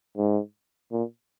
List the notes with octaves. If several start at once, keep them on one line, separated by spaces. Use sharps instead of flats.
G#2
A#2